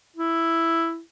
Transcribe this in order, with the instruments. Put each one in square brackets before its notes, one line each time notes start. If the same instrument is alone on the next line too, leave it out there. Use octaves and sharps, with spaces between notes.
[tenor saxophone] E4